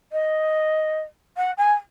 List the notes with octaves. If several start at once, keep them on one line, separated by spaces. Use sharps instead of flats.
D#5
F#5
G#5